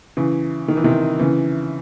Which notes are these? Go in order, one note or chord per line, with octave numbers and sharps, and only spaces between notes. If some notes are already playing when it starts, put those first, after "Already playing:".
C#3 E3
D#3
E3
C3 D#3
C#3 E3